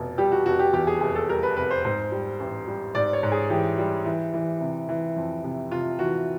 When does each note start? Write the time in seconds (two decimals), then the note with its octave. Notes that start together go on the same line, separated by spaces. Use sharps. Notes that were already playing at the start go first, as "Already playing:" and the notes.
Already playing: F1 B2
0.18 G3 G4
0.32 F#4
0.46 F1 F#4
0.59 G4
0.73 E2 G4
0.87 G#4
1.01 F1 G#4
1.15 A4
1.28 G3 A#4
1.43 B4
1.57 F1 B4
1.71 C5
1.84 G#2 C5
2.11 G3
2.40 A1
2.67 G3
2.95 G#2 D5
3.13 C#5
3.23 G#2
3.32 G#4
3.50 E3 G4
3.78 G3
4.05 E3
4.34 E3
4.61 C3
4.89 E3
5.16 F2
5.44 C3
5.71 C3 F4
5.99 E3 F#4